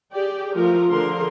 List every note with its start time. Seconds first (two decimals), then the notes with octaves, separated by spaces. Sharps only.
0.13 G4 G#4 D5 G5
0.55 F3 A3 F4 A#4
0.90 D3 F3 D4 G#4 A#4 C6